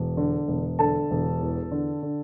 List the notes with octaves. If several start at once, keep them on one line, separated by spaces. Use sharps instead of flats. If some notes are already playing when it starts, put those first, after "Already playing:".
Already playing: E1
D3
E1
D3 A4 A5
E1
E2
D3
D3